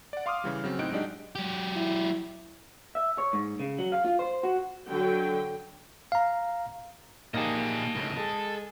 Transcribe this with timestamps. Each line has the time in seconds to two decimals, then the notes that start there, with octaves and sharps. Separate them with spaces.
0.13 D5 F#5
0.26 F5 C6 D6 D#6 F6
0.44 C#3 E3 G3
0.64 C#3 F#3 C4
0.79 A2 C4 D#4 F#6 D7
0.92 F#3 G#3 D4 D#4 G4
1.35 F#3 G4
1.76 E4
2.95 E5
3.18 C#5
3.33 G#2
3.60 C#3
3.78 F#3
3.92 F5
4.05 F4
4.19 C5
4.43 F#4
4.87 D3 F#3 G5
6.12 F5 A#5
7.34 A#2 A#3 D#4 G4 G#4 D#5 A5
7.96 C#2 A2
8.18 G#3 A4